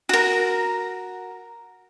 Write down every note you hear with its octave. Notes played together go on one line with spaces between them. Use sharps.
F#4 A#4